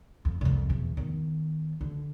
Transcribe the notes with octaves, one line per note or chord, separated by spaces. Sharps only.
F2
C2 F2
E2 B2
D#3 B3
D3